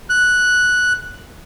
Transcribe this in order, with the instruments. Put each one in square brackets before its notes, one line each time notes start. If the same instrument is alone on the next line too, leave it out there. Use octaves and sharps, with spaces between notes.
[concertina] F#6